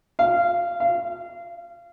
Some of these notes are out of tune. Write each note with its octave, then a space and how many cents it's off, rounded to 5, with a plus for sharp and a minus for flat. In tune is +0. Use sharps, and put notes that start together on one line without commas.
F5 -15
F5 -25